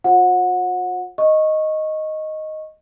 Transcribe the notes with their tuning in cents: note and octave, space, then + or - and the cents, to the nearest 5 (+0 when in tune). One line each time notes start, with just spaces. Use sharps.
F4 +45 C5 +30 F#5 -25
D#5 +0 C#6 -15